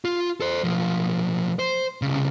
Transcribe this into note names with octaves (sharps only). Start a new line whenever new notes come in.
F4
A4 C5
B1 F3
C5
C2 C#3